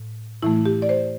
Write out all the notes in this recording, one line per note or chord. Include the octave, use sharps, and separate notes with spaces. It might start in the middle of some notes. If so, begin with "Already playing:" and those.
Already playing: A2
A2 E3 A3 E4
G4
D5
C5